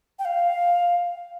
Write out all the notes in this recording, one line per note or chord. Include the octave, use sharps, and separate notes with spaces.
G5
F5